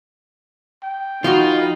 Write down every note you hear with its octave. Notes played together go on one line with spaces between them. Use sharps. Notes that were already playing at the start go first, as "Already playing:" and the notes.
G5
D#3 F3 D#4 F4 F#4 D#5 B5